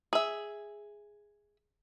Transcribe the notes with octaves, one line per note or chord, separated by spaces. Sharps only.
G#4 E5